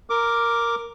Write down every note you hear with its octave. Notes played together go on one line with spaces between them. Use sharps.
A#4 D6